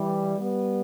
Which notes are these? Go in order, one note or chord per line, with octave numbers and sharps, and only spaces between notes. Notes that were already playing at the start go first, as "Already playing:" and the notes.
Already playing: E3 G3
G3 B3